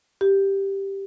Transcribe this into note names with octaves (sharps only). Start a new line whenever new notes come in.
G4